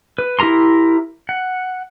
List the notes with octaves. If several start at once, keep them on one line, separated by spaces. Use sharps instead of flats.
B4
E4 G4 A#4 A#5 C6
F#5